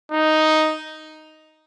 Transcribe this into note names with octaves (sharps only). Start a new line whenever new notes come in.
D#4